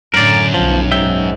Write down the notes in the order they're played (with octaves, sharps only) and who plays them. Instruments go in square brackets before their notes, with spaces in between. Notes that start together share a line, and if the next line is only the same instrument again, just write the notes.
[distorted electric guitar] F#2 [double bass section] A2 D3 [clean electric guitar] A#4 D5
[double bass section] B1 [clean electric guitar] F3
[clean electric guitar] G#2 E5 G5